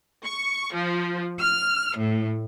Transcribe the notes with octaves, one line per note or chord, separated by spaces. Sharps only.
C#6
F3
F6
A2